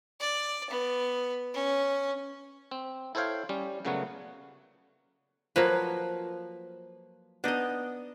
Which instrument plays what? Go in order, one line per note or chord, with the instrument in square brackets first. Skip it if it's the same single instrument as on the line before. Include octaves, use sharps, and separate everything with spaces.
[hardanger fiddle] D5
B3
C#4
[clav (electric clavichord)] C4
E4 A4 C5 C#5 F5 G5
G3 C#4
A#2 C#3 F#3 A3 B3 F#4
[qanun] F3 [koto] F#3 A#3 B4
[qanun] B3 D#5 [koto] D4 D#4